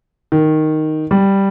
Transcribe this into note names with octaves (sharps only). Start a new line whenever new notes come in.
D#3
G3